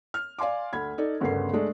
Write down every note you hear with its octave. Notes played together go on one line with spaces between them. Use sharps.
F6
D5 F5 G#5 C6 D6
D2 B5 G#6
D#4 A4 D5
G1 D2 C#3 B3 A#4 C7
G#3 A3 D4